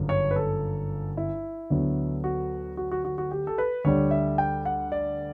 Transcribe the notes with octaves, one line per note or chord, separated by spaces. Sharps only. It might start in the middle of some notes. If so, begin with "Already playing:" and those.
Already playing: G1 F#2 C#3
C#5
B4
A4
E4
D2 D3 F#3 B3
F#4
F#4
F#4
F#4
F#4
G4
A4
B4
D2 D3 G3 C#5
E5
G5
F#5
D5